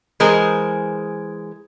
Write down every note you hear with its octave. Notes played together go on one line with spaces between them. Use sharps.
E3 G#3 G#4 A#4 C5